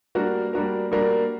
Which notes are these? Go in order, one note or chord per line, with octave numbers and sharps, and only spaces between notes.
G3 A#3 D4 F#4 A#4
G3 A#3 D4 F#4 A#4
G3 A#3 D4 F#4 A#4